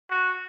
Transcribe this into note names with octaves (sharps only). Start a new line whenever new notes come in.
F#4